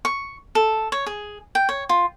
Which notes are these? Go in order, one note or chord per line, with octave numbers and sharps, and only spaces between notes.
C#6
A4
C#5
G#4
G5
C#5
F4